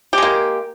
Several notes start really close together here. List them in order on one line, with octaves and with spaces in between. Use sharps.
G4 G#3 A#3